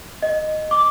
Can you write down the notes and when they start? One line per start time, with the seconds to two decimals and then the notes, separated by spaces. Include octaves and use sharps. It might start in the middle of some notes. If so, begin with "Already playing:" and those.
0.22 D#5
0.71 D6